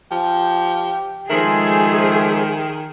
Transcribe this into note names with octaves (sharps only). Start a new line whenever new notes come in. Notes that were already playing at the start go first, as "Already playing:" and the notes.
F3 G4
D#3 F3 G#3 A3 G#4 C5